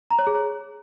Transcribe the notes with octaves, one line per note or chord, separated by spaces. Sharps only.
A#5
C#5
G#4
C#5